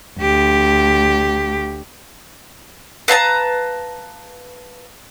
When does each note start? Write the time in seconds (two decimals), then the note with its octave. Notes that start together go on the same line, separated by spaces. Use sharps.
0.19 D2 G4
3.08 B4 F5 A5 A#5